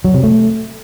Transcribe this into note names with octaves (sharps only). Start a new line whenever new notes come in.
F#3
C3
A3